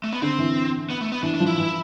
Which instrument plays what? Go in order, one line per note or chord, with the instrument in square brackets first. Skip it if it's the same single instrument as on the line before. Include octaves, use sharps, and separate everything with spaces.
[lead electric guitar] A3
B3
[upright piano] D3 [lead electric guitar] C4
[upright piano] E3
[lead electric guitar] B3
A3
B3
[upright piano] E3 [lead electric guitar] D4
[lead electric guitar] D4
[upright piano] F3
[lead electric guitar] E4
[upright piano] E3